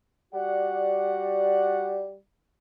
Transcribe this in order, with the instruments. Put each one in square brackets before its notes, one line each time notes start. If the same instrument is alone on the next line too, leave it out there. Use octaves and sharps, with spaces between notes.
[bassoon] G3 [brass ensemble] F#4 D5 F#5